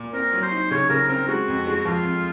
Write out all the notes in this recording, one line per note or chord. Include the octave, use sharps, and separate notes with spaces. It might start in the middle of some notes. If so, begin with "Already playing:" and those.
Already playing: A#2
C4 A#4
F#3
C5
D#4
C#3 C#5
C#3 A#4
C4 A#4
G#3 F#4
F2
G#3
F3 F4
F2